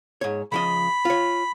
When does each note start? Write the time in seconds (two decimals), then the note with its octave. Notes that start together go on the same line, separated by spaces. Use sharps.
0.21 G#2 C#5
0.52 C#3 F3 D#5 B5
1.05 F4 C#5